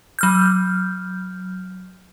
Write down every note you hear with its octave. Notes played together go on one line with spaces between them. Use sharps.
F#3 F6 G6